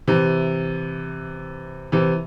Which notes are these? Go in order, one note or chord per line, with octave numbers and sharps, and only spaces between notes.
C3 E3
C3 E3